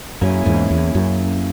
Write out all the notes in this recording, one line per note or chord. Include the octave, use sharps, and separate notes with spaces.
F#2 A#3 C#4 E4 G#4
E2 G#2
E2
F#2